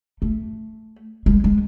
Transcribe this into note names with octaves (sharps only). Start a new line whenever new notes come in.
A3
G#3
G#3